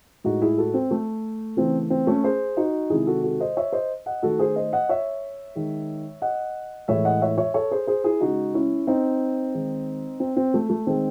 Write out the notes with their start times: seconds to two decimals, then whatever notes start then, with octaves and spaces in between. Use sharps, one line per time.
0.24 A2 G#3 D#4 F#4
0.42 E4 G#4
0.58 F#4 A4
0.74 C4
0.91 A3
1.57 C#3 E3 A3 C4
1.90 C4
2.07 A3 C#4
2.24 G#4 C5
2.57 D#4 F#4
2.90 C3 D#3 G#3 E4 G#4
3.07 F#4 A4
3.23 F#4 A4
3.40 C5 D#5
3.57 C#5 E5
3.72 C5 D#5
4.06 D#5 F#5
4.23 D#3 A3 F#4 A4
4.39 G#4 C5
4.56 C5 D#5
4.73 D#5 F#5
4.89 C#5 E5
5.55 D#3 G#3
6.22 D#5 F#5
6.88 A2 E3 G#3 C#5 E5
7.05 D#5 F#5
7.22 C#5 E5
7.38 C#5 E5
7.54 A4 C#5
7.71 G#4 C5
7.87 G#4 C5
8.04 E4 G#4
8.21 C#3 G#3 D#4 F#4
8.54 C#4 E4
8.87 C4 D#4
9.54 D#3 G#3
10.20 C4
10.37 C4
10.54 A3
10.70 A3
10.87 D#3 G#3 C4